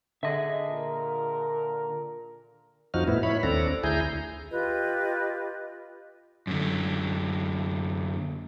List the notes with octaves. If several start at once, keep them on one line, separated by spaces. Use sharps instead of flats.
D3 G#4 D#5 E5
A#2 A#4
F2 F3 D#4 F#4 F6
A2 B3 E4
E4 C#5 B5
D#2 C4 D4 A4 A#5
D2 E4 G#4 G#5 A#5 G6
F4 G4 B4 D#5
F#2 D3